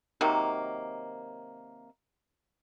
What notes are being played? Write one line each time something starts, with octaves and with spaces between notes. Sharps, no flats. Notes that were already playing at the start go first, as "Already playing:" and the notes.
C3 D#3 F#3 A#3